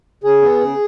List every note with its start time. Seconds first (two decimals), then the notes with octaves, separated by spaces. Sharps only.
0.24 C#3 G#4
0.42 B3
0.61 C#3